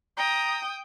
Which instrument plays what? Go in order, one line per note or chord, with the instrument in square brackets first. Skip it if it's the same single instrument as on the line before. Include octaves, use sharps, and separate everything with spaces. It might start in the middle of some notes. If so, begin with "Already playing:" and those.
[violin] G5 D#6 [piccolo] A#5